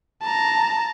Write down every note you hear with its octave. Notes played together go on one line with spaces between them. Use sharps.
A5 A#5